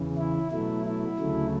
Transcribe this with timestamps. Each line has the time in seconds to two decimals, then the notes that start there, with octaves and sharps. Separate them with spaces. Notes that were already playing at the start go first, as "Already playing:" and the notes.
Already playing: E2 C#3 E3
0.17 E4
0.51 B2 F#3 A3 E4
0.85 E4
1.18 D2 C#3 F#3 A3